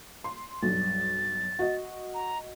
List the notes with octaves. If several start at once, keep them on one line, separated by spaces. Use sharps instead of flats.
C6
B1 G2 A6
F#4 D#5
A#5